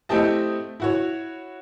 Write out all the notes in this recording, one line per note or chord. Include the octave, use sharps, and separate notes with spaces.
A3 C4 E4 G4 D#5 A5
E4 F#4 C#5